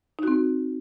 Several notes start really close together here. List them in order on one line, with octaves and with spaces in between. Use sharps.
D#4 F#4 C4